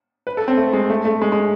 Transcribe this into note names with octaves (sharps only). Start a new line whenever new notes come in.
B4
A4
C4
A3
G#3
A3
A3
G#3
G#3